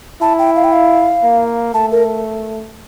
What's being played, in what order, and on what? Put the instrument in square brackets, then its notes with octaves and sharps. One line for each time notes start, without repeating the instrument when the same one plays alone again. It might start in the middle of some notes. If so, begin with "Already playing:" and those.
[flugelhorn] E4 [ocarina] A5
[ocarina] G5
F5
G5
F5
[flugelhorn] A#3
[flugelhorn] A3 [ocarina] A5
[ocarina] A#4